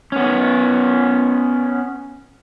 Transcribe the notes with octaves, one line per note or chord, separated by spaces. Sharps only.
B3 C#4